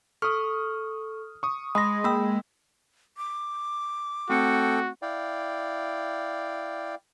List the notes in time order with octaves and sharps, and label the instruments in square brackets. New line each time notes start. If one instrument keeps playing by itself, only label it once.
[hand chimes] A4 C#6 [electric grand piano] D#6 F6
[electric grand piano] C#6 D#6
[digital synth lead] G#3 [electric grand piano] B5 C6 A#6 [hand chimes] D#6
[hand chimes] A#3 E6 [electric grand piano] G5 B5
[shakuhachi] D6
[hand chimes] A3 C4 C#7 [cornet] F#4 [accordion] A4 G5
[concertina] E4 D5 F5 G5